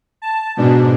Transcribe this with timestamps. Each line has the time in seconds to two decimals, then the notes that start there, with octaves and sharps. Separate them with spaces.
0.22 A5
0.57 G#2 B2 D4